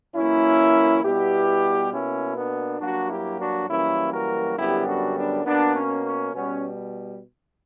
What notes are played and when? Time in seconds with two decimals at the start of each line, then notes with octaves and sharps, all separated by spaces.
0.15 F#2 E3 A#3 C#4 E4
1.03 B2 G3 B3 E4 G4
1.92 B2 A#3 C#4 E4
2.36 B3 D4
2.80 G2 F#3 A#3 D4 F#4
3.09 E4 G4
3.39 D4 F#4
3.69 F#2 E3 G3 A#3 C#4 E4
4.13 F#4 A#4
4.57 F#2 D3 G3 B3 E4 G4
4.87 D4 F#4
5.17 B3 D4
5.45 B2 A#3 B3 D4
5.76 C#4
6.05 C#4
6.33 B2 G3 B3 C#4